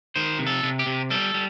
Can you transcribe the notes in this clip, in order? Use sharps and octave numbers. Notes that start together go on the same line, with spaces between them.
D#3 C5
C3
A4
C3
G4
C3
G3 A4
G3